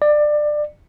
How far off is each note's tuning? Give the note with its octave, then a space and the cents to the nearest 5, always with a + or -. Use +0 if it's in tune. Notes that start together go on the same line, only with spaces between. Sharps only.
D5 +20